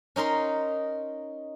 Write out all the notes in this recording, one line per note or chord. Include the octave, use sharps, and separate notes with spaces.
C#4 D#4 A#4 C6